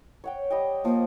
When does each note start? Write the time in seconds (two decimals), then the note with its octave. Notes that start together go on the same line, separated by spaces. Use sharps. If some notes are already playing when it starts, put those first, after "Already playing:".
0.24 C#5 F#5 G5
0.50 G3 D#5 G5
0.85 F3 A#3